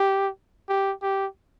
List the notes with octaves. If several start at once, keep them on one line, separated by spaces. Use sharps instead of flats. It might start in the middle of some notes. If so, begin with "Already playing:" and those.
Already playing: G4
G4
G4